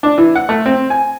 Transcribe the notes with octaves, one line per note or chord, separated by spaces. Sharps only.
D4
E3
F#5
A3
C4
G#5